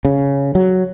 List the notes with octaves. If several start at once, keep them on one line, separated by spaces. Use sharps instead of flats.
C#3
F#3